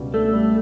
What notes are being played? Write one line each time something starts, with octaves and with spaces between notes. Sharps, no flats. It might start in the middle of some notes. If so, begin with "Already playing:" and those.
Already playing: C#2 B2 G3
A3 D4 A4
G3